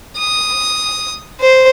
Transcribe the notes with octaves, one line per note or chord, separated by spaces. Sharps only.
D#6
C5